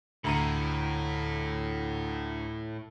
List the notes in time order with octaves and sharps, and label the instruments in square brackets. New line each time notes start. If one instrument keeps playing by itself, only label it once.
[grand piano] D2 A#5 D#7 [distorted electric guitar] A2